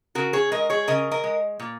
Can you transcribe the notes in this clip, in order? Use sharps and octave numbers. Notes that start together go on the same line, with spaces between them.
C#3 F#4 A#4
G#4 C#5
G#3 A#4 D#5
G#4 C#5
C#3 A#4 D#5
A#4 D#5
G#3
A#2